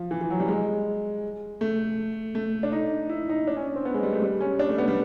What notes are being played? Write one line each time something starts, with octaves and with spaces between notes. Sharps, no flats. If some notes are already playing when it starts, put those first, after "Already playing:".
Already playing: F3
E3
E3
F#3
G3
G#3
A3
A3
D4
D#4
E4
D#4
D4
C#4
C4
B3
G#3
G3
A3
G3
C#4
D4
A3
B3
G3